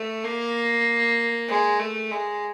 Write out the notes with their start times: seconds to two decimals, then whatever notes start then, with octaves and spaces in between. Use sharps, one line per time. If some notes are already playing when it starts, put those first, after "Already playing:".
Already playing: A3
0.24 A#3
1.48 G#3
1.79 A3
2.11 G#3